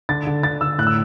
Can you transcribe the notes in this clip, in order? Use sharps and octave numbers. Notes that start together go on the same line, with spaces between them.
D3 A6
D3
D3 A6
D3 E6
A2 F#6
E6